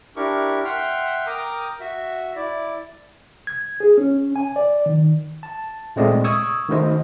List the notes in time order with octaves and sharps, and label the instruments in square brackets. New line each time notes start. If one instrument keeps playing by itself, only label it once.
[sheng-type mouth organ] D4 E4 G4 A#4 C#6
E5 F#5 G5 C6 F6
A#4 G5 A#5 D6 D#6
F#4 E5
E4 D5
[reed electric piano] G#6
G#4
C#4
G#5
D5
D#3
[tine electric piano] A5
A#2 G#3 A3 C4 D5 D#5
C#6 D#6 E6 G#6
D#3 A3 F#4 A#4 C5 D#5